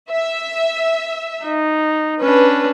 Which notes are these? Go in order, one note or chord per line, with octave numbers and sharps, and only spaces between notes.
E5
D#4
C#4 D4 B4